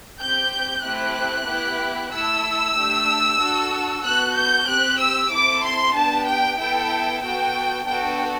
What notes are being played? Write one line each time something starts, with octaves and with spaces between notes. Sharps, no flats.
C4 G4 G6
A3 C4 E4 G4 F#6
B3 E4 G4
A3 E4 A4 E6
A3 D4 G4
D4 F#4 A4
B3 F#4 A4 F#6
G6
C4 G4 F#6
E6
C4 E4 A4 D6
C6
B3 D4 G4 A5
G5
B3 E4 A4 G5
B3 F#4 A4 G5
B3 D4 F#4 A4 G5